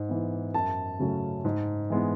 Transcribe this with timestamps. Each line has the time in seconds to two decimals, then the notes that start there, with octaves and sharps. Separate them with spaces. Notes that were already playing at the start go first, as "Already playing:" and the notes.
Already playing: G#2
0.09 E3 B3
0.54 F#2 A5
0.99 C#3 F#3 A3 C#4
1.45 G#2
1.90 E3 G#3 B3